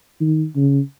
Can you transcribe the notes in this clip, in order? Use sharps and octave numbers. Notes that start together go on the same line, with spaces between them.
D#3
C#3